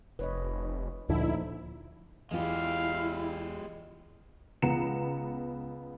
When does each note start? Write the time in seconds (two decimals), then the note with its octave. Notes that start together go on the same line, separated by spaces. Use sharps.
0.19 F1 B4 C#5 D#5
1.09 D2 A#2 D3 F3 D#4 E4
2.31 E2 G#3 E4 F4 G4 F5
4.62 C#2 B3 A#5 C#7 E7